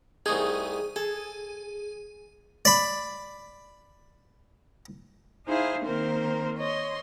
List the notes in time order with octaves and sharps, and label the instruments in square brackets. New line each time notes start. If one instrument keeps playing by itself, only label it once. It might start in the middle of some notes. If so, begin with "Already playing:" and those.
[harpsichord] C2 A3 D#4 [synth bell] G#4 D#6
[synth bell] G#4 [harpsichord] A4
[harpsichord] D5 B5
[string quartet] D#4 E4 G#4 C5 F5
D#3 A#3 C4 A#4 C5
C#5 D#5 C6